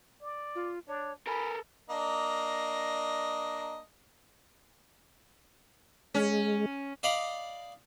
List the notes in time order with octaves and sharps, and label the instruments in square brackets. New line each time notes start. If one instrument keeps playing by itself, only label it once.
[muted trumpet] D5
[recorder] F4
[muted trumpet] D4 [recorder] C#5
[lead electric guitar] A4 A#4 [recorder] G#5 [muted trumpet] B5
[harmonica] A#3 D4 D#5
[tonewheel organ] G#3 [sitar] C#4
[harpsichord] D5 D#5 F5 B5